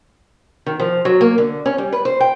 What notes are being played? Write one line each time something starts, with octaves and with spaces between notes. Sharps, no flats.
D#3
F3
F#3
A#3
D3
C#4
G3
B4
C5
G5